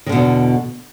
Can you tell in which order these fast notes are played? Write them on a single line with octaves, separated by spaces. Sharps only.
D#3 D3 B2 E2